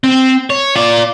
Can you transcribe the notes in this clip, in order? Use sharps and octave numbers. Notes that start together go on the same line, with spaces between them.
C4
C#5
F4 D5